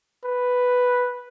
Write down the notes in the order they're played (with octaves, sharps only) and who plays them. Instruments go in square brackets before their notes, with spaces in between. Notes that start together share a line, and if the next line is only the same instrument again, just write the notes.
[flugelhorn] B4